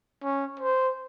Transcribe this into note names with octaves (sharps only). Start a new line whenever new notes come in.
C#4
C5